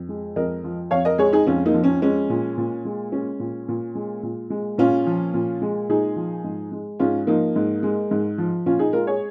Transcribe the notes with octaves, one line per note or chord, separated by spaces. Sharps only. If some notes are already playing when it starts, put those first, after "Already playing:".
Already playing: F2
G#3
F2 A#4 D#5
F3
F2 C#5 F5
A#4 D#5
G#3 G#4 C#5
D#4 G#4
F2 C#4 F4
A#3 D#4
F3
C#4
G#3 C#4
A#2
A#2
G#3
G#3 C#4
A#2
A#2
G#3
A#2
G#3
A#2 C#4 F4
F3
A#2
G#3
A#2 D#4 G#4
F3
G#2
G#3
G#2 C#4 F4
F3 A#3 D#4
G#2
G#3
G#2
F3
A#2 C#4 F4
D#4 G#4
G#3 F4 A#4
G#4 C#5